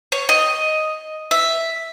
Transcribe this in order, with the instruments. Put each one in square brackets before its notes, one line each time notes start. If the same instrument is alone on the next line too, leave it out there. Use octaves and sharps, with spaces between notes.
[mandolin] C#5
D#5
E5